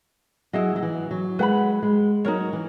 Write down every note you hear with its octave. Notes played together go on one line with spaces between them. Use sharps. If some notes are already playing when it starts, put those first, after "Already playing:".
F#3 E4 G#4 D#5
F#3
E3
F#3
G#3 B4 F#5 B5
G#3
F#3 D#4 A#4 C#5
E3